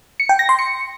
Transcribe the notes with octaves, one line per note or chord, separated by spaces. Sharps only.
C#7
G5
A#6
C6
C#7